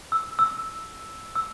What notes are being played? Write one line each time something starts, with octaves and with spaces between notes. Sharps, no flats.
E6
E6
E6